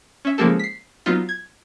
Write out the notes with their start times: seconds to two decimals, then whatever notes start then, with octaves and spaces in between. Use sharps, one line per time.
0.25 C#4 E5
0.38 C#3 F3 G#3 A#3 G4 A4
0.59 B6 C7
1.06 F#3 B3 D#4 F4
1.29 G#6